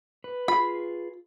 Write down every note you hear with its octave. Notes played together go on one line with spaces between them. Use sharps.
B4
F4 G#4 B4 B5